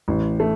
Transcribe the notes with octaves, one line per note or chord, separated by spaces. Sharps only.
A1
A3